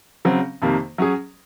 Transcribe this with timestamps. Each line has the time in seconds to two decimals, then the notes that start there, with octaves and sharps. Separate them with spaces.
0.25 C#3 F#3 C4
0.62 F2 C3 D#3 A#3
0.98 F#3 C#4 G#4